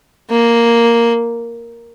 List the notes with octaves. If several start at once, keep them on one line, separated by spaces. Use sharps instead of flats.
A#3